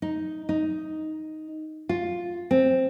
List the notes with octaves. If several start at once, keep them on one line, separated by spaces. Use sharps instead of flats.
D#4
D#4
F4
C4